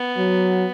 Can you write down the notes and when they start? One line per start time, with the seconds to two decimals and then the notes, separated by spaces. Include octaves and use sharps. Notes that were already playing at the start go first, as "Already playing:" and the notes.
Already playing: B3
0.18 F#3